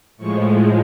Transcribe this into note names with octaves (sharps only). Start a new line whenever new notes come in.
A2 F3 G#3 C#6